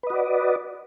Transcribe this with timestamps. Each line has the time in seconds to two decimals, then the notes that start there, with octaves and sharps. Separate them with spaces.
0.03 B4
0.07 D#5
0.10 F#4
0.13 D5